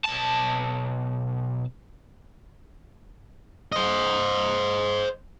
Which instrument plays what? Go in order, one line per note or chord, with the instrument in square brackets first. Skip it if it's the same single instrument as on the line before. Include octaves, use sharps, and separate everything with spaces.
[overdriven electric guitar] B1 A5
[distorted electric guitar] C5 D#5